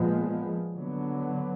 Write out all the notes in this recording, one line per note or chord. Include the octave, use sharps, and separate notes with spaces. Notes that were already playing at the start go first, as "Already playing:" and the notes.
Already playing: A#2 F3 G#3 B3
D3 F#3 B3